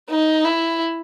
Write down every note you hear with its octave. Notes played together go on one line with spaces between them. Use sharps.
D#4
E4